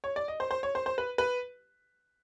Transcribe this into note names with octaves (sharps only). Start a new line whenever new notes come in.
C#5
D5
D#5
C5
C5
C#5
C5
C5
B4
B4